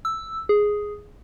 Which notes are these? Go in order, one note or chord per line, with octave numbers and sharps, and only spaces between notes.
E6
G#4